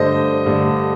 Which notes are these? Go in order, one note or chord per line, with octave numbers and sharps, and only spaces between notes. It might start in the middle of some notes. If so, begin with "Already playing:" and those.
Already playing: G2 D3 A3 C5 D#5
G2 D3 A3